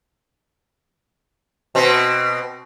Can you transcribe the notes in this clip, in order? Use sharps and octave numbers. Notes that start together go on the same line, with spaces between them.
B2 C4